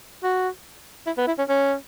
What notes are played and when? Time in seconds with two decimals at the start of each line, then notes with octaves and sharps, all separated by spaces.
0.23 F#4
1.07 E4
1.18 B3
1.27 E4
1.38 C#4
1.49 C#4